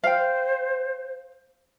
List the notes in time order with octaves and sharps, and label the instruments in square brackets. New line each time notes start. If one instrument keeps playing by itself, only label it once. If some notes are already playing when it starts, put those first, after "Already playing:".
[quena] C5 [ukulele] F5 G5